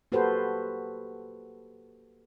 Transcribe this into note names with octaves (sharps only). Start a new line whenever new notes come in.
A#3 F#4 G4 A4 B4 C5